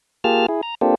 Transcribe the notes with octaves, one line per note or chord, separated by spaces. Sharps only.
A#3 F4 G4 G#4 A5 F6
E4 G#4
A#5
A#3 C4 D4 F4 G4 A4